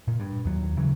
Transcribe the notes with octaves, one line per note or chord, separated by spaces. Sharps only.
A#2
G2
D#2 F#3
C#3 E3 F#3